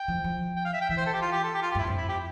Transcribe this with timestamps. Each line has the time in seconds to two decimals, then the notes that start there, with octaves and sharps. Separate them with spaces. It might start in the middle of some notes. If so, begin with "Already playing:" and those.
Already playing: G5
0.08 F3
0.24 F3
0.56 G5
0.65 F5
0.74 E5
0.81 G5
0.89 E3 E5
0.97 C5
1.06 A4
1.13 G4
1.22 F4
1.32 G4
1.44 A4
1.54 G4
1.63 F4
1.71 G4
1.75 G2 E4
1.87 F2
1.97 E4
2.09 G4